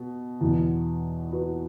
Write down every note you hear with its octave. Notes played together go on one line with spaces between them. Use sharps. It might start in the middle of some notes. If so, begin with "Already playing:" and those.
Already playing: B2
E2 B2
F#4 B4